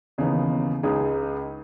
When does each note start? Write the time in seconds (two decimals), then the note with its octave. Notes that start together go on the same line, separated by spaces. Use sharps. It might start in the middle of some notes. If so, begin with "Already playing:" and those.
0.18 D#2 C#3 E3 B3 D#4
0.83 C#2 C#3 G#3 D#4 G#4